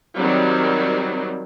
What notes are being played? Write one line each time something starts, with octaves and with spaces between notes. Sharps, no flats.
D#3 F#3 G3 C4